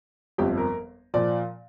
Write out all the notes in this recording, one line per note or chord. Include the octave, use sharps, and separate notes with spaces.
G1 F2 F3 G4
A#4
A#2 F3 D5